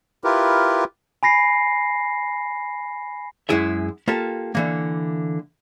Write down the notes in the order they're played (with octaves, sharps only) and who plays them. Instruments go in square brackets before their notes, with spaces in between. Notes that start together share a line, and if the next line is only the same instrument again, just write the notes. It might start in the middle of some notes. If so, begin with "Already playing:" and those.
[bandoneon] E4 F4 G4 A#4 B4
[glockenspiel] G#5 B5 A#6 C7
[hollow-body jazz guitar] F#2 C3 G#3 E4 G#4 E5
A#3 F4 G4 A4
D3 E3 A#3